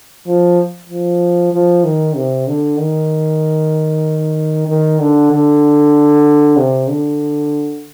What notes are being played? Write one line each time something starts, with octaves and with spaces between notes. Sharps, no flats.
F3
F3
F3
D#3
C3
D3
D#3
D#3
D3
D3
C3
D3